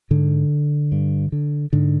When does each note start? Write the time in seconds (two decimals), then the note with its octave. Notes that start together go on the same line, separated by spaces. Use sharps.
0.11 G#2 D3
0.92 G2
1.32 D3
1.73 G#2 D3